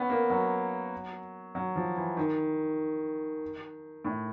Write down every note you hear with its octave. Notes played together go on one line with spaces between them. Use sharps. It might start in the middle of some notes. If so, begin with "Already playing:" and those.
Already playing: B3 C#4
A#3
F#3
F#3
F3
E3
D#3
A2